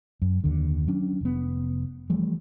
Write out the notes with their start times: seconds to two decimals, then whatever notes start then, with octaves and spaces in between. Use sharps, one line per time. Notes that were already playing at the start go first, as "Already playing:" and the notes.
0.22 F#2
0.44 D#2 D3
0.88 F#3 C#4 D4
1.21 F1 B3
2.10 E3 F3 G3 A3